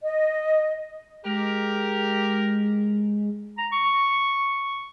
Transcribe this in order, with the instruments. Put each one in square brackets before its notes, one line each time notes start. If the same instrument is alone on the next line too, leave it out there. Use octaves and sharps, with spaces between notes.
[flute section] D#5
[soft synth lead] G#3 [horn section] G4 A#4
[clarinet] A#5
C#6